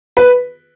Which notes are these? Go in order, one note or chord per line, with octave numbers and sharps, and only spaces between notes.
B4